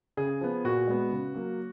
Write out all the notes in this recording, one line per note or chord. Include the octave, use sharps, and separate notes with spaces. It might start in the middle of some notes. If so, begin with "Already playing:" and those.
C#3 G#4
F3 B3
A#2 F#4
G#3 B3
C#3
F#3 A#3